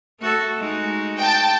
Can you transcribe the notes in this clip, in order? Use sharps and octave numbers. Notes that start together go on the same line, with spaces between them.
A3 F#4 A4
G#3 D#4 F#4
G5 A5